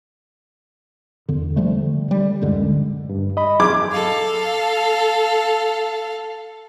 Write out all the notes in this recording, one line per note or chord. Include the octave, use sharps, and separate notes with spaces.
E2 D3
D3 F3 G3 A3
D3 G3
D1 F#2 D3 G#3
G2
D#5 B5
F#3 G#4 D6 G#6
A4 F5